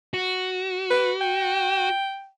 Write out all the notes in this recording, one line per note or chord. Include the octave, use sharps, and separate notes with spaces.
F#4
B4
G5